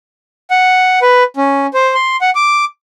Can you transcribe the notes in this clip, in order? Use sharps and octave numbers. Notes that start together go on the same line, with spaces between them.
F#5
B4
C#4
C5
C6
F#5
D6